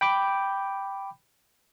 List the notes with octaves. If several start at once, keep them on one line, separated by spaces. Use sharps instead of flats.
G5 B5 D6 G6